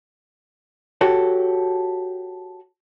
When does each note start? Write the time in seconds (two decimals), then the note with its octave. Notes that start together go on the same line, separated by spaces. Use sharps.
1.01 F#4 G4 A4 C#5